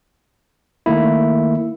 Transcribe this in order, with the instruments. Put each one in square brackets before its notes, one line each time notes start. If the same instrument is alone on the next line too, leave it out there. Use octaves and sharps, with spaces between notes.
[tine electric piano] D#3 A3 A#3 E4